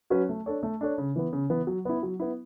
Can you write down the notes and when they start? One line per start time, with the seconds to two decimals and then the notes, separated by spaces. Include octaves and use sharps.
0.10 F#3 C#4 F#4 B4
0.29 A3
0.46 D4 A4 C#5
0.63 A3
0.81 D4 A4 C#5
0.98 C#3
1.16 E3 B3
1.33 C#3
1.50 E3 B3
1.67 F#3
1.85 B3 E4
2.03 F#3
2.20 B3 E4